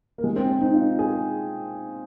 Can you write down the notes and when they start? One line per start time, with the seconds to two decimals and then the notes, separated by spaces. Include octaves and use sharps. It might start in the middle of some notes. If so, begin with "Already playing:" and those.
0.18 A#3
0.24 G#3
0.36 C4
0.49 C4
0.61 D#4
0.74 F4
0.99 G#4